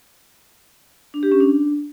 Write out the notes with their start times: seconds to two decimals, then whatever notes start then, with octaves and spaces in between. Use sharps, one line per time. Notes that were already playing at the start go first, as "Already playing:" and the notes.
1.14 D4
1.23 G4
1.32 C#4
1.40 D4